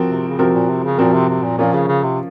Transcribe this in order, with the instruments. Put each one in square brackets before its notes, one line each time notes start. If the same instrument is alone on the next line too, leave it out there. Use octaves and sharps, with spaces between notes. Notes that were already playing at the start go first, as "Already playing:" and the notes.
Already playing: [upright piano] F3 C4 F#4 A#4
[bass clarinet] C3
C#3
[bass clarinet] C3 [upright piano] F3 C4 F#4 A#4
[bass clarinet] A#2
C3
C#3
[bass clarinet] A#2 [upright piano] F3 C4 F#4 A#4
[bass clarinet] C3
C3
A#2
[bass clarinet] A#2 [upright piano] F3 A#3 C#4 F4
[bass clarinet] C#3
C#3
C3